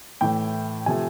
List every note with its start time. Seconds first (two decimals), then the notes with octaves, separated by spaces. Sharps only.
0.21 A2 E3 A3 G5
0.86 C3 F3 A3 G#5